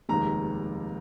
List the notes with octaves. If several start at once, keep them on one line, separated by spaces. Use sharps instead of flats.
F1 D#2 D#3 G#3 A#5